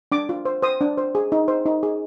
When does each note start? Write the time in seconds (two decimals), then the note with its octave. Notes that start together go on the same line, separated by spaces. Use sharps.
0.12 D4 D6
0.29 F4
0.45 C5
0.62 C5 D#6
0.81 D4
0.98 C5
1.15 G#4
1.32 D#4
1.48 C5
1.66 D#4
1.83 G#4